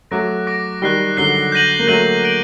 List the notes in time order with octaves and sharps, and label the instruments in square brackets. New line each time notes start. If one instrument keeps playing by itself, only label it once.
[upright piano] F#3 A3 [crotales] D6 F#6 A#6 D7
[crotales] D6 F#6 A#6 D7
[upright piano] D#3 G3 [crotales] F#6 C7 G7
[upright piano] D3 F#3 [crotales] F#6 C7 G7
[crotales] G6 A#6 D#7 F#7
[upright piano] A#3
[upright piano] F#3 A3 [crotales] G6 A#6 D#7 F#7
[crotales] G6 D7 F#7